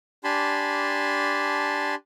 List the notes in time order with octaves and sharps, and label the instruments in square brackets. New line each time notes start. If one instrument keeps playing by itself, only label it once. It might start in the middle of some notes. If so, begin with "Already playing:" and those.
[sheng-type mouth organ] D4 G4 G#5 A5 B5 C6